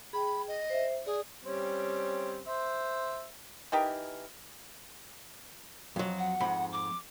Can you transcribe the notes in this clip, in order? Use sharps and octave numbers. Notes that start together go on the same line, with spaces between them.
G#4 G5 B5
D#5
C5 E5
G#4 D5
G3 C4 C#4
C5 E5
E3 D#4 G4 A#4
F2 F#3
F#5
F2 G#2 B5
D6